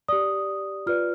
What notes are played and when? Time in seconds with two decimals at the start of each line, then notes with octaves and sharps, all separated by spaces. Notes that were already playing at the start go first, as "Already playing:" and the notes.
0.08 G4 D5 D#6
0.86 F4 B4 D5 F6